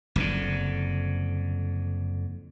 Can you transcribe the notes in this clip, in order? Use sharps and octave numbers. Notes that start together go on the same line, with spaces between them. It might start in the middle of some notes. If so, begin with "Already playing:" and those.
F#1 F2 A#2 D3